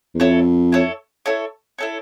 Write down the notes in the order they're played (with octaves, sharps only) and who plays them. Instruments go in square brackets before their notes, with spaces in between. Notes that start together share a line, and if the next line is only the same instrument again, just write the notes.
[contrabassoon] E2
[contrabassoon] F2 [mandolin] E4 A4 C#5
[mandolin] E4 A4 C#5
E4 A4 C#5
E4 A4 C#5